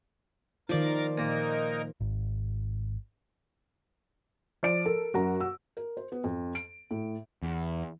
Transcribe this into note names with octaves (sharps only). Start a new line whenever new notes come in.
D#3 F3 F4 A#4 D5 A6
A#2 A#3 D#4 A#4
G#1
F3 D5 D7
A4 A#4
F#2 F#4 A#4 A#5
E6
A#4
C5
B3
F2
D7
A2
E2